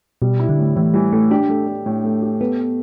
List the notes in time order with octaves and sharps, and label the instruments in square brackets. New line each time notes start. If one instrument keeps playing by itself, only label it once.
[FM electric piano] B2 [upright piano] G3
[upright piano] E4
[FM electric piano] D3
[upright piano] A2
[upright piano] A2 [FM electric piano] E3
[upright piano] E3 [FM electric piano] G3
[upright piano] A2 [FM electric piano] A3
[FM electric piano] D4 [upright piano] G4
[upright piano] A3
A3
A2
A3
G4
[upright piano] A3 [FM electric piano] B3